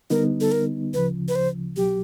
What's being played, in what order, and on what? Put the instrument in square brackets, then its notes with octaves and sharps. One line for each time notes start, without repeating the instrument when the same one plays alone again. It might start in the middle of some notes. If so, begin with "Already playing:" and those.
[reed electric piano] D3 G3 B3 D#4 [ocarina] A#4
[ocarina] A4
A#4
[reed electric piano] D2 C#3 F3 [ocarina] B4
[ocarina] B4
C5
[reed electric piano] C2 B2 F#3 [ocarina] G4